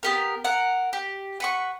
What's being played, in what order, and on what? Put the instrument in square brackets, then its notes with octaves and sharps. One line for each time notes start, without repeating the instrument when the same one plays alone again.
[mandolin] B3 G4 A#4
A#4 F#5
G4
B4 F#5 C#6